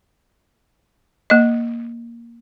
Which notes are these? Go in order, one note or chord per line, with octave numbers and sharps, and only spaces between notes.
A#3 D#5